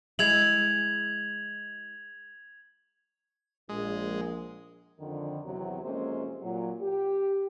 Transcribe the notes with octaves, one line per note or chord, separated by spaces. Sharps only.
G#3 E4 G#6 F7 F#7
A#1 G#3
F2 D3 D#3
E2 C3 F#3
F2 C3 G#3 A#3 C#4 C5
A#2 F#3
G4